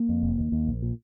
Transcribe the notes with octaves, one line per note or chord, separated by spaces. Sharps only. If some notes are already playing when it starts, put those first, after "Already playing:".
Already playing: A#3
F2
F1
D#2
D#2
A#1
A#2